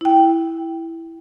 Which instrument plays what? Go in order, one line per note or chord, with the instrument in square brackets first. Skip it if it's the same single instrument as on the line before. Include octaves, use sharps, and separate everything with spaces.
[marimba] E4 G5